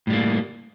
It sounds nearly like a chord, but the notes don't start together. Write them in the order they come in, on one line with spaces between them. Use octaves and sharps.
A2 G3 A#3